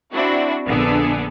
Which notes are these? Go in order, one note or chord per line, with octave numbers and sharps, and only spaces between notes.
C4 D4 E4 F#4
A#1 D3 B3 G#4 A4